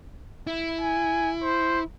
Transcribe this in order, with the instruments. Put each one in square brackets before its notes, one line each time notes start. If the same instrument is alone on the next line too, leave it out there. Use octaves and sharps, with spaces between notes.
[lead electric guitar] E4
[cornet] G#5
C5